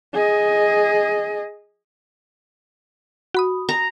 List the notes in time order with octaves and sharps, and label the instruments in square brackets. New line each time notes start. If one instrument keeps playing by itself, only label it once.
[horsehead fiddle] G#4 D#5
[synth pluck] F#4 B5 D#6
[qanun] A#5